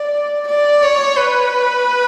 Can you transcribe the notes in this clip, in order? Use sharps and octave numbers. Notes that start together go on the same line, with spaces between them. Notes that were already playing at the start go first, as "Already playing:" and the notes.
Already playing: D5
D5
C#5
B4